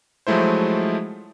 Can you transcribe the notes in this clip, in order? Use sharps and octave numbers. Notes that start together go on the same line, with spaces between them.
F3 F#3 G#3 A3 E4 C5